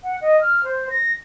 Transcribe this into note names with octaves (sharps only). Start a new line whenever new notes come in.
F#5
D#5
F6
C5
A#6